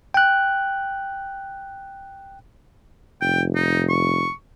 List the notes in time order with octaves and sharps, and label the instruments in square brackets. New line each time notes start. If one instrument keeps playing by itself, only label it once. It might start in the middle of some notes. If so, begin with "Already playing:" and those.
[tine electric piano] G5 F#6
[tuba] F1 [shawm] G5
[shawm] D#4
C#6